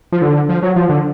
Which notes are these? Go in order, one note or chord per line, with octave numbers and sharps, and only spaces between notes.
F3
D3
F3
F#3
F3
D3